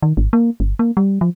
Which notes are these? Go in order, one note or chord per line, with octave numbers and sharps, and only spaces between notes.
D#3
G#1
A#3
G1
A#3
G3
F3